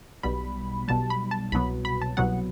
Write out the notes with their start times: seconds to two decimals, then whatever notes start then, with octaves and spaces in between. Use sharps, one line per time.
0.23 B1 B2 G3 B5
0.88 B1 B2 G3 A5
1.10 B5
1.31 A5
1.52 C2 B2 F#3 B3 B5
1.85 B5
2.02 A5
2.17 C2 B2 F#3 B3 F#5